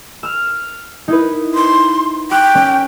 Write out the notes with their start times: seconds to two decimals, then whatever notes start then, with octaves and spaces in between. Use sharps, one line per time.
0.23 E6 F6
1.08 D#4 E4 B4
1.55 C6
2.31 G5 C#6 D6 F#6
2.55 C#4